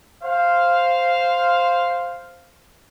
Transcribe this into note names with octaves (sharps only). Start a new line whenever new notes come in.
C5 F5